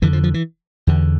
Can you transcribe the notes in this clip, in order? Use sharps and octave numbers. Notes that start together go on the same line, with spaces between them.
F2 D3 E3
F3
F3
E3
E2 D3